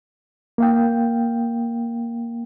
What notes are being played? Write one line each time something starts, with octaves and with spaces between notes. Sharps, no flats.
A#3 F5 G5